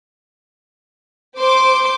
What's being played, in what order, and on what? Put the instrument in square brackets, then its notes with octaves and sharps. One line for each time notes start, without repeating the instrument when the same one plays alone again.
[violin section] C5 D6 [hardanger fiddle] C6